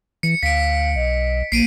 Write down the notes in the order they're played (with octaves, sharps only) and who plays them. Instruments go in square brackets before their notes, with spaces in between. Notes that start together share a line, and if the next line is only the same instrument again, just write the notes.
[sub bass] E3 [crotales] C#7
[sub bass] D2 [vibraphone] F5 [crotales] B6 D7
[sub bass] B1 [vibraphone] D#5
[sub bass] A#1 [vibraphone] A#3 [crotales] C7 D7 D#7